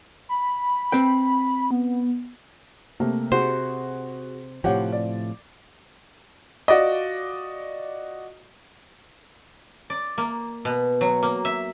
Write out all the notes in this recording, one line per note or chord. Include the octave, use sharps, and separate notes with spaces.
B5
C4 B4 G5
B3
C3 A3 A#3
C3 F#4 G#4 C5
A2 C3 F3 G4 C#5 F#5
D5
F4 F#4 D5 D#5
D5
A#3
B2
F#3
A#3
E5